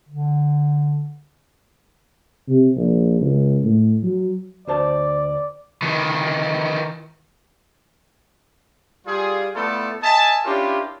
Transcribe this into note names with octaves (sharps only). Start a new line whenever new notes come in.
D3
C3
A#1
C#2
A2
F#3
D2 C5 D5 A5
D#3 E3
G3 F4 G#4
A3 B3 E4 F4 A4 D5
D#5 E5 G#5 A5
C#4 D4 E4 F4 G4 A#4